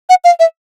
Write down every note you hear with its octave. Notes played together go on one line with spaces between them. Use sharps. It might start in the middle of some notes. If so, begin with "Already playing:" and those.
F#5
F5
E5